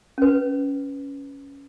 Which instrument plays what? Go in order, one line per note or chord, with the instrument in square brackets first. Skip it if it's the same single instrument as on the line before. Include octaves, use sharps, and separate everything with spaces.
[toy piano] C#4 B4